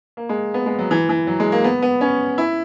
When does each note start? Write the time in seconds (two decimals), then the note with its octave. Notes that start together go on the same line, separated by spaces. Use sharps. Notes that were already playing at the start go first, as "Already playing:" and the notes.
0.17 A#3
0.29 G#3
0.54 B3
0.66 G#3
0.79 F#3
0.91 E3
1.09 E3
1.27 F#3
1.40 G#3
1.52 A#3
1.64 B3
1.82 B3
2.01 C#4
2.38 E4